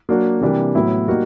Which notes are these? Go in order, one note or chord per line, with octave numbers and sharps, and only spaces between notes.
F#3 A#3 D4 F#4
C3 E3 G3 A#3 D4
A2 F#3 B3 E4
G3 A#3 D#4 F#4